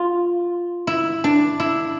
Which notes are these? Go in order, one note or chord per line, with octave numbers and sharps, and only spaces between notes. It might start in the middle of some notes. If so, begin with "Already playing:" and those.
Already playing: F4
E4
D4
E4